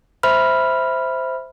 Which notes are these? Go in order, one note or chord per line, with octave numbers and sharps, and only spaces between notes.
C5 E5 B5 F6